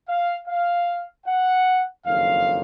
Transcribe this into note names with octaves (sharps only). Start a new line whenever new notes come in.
F5
F5
F#5
F#1 F2 D#3 F5